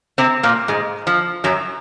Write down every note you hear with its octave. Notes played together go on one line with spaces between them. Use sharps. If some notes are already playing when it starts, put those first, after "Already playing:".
C3 C4
A#2 A#3
G#2 G#3
F3
F#2 F#3